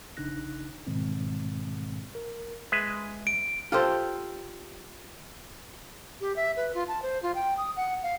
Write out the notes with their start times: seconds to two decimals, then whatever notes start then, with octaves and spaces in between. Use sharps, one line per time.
0.17 A#1 C#3 D4 D#4 F#6 A#6
0.87 G#2 B2 D#3 G#3 C4
2.15 A#4
2.72 G#3 B4 E5
3.27 D7
3.72 F4 G4 A4 C5
6.21 G4
6.36 E5
6.57 B4
6.74 F4
6.88 A5
7.02 C5
7.22 F4
7.35 G5
7.57 D#6
7.76 F#5
8.03 F5